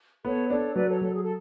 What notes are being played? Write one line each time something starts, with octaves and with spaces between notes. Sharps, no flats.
B3 A4 C#5
D4 A4 C#5
F#3 B4 D5
A4 C#5
F#3 A4
G#4
A4